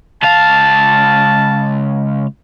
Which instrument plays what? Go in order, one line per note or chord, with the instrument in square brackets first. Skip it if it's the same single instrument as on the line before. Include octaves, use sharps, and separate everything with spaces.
[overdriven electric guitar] C#2 F5 [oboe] A5